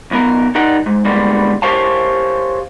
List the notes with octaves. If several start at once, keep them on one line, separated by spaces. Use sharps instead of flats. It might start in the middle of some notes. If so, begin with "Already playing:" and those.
B1 B3 A#4
G3 D#4 A#4 F#5
G#2
D2 G2 G3 G#3 A#3 B3
G4 A#4 C5 C#5 F5 A5